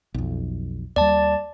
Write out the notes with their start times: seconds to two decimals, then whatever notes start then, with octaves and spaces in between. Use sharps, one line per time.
0.14 B1 F2
0.96 D#2 G3 D5 A5